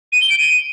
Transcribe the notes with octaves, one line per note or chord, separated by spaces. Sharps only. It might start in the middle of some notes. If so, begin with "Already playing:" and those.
D#7
G7
D7
D#7